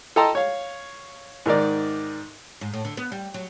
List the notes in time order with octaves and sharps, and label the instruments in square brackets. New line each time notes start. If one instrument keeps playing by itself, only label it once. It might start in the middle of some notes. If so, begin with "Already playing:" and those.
[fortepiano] A4 D#5 G5 A5 A#5 C6
C#5 F5
G#2 D#3 A#4 D5
[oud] G#2
A2
D3
B3
G3
F#3